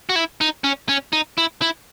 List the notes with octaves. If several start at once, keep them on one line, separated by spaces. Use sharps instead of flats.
F#4
E4
D#4
C#4
C#4
D#4
E4
E4